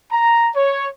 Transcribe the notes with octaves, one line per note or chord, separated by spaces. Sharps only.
A#5
C#5